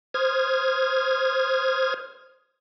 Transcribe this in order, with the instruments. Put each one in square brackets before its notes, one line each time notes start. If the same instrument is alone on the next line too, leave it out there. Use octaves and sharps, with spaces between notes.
[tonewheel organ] C5 D#6 F6 G#6